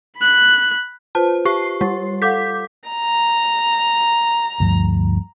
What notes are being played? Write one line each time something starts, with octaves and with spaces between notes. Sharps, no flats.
B5 F#6
F4 B4 C5 A5
G4 C#6 C7
G3
A4 F5 F#5 D6 G6 B6
A#5
D2 G2 F3